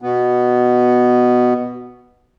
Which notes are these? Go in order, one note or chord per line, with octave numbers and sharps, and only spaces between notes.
B2 B3